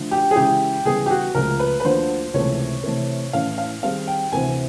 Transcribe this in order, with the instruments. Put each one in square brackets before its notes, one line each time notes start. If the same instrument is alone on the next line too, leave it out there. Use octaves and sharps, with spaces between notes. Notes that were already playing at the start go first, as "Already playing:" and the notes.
Already playing: [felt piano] D3 F3 A3
[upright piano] G4
G#4
[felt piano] C#3 E3 G#3 C#4 E4 [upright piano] G4
[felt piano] C#3 E3 G3 B3 [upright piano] G#4
[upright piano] G4
F#4
[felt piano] C#2 C#3 F3 A3 [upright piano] A#4
[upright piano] B4
B4
[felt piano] D2 D3 F3 A#3 D4 [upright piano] C5
[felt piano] C#2 C3 E3 A3 [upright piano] C#5
[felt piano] C3 E3 A3
[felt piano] A2 E3 A3 C#4 [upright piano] F5
[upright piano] F5
[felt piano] D#3 G3 C4 D#4 G#4 [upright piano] F5
[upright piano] G5
[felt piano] D2 C3 E3 A3 C4 [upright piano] G#5